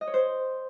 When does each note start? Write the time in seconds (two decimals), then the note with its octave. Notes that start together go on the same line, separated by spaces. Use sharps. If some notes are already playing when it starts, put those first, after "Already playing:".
0.01 D#5
0.07 C#5
0.14 C5